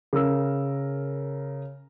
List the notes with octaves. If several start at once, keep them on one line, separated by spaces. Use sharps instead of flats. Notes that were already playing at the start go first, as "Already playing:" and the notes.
C#3 A#4 E6